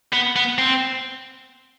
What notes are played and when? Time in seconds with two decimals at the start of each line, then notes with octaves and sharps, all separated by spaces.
0.13 B3
0.36 B3
0.58 C4